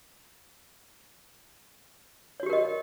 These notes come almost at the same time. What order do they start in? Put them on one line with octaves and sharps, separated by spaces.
C#5 F#4 G4 A#4 D#5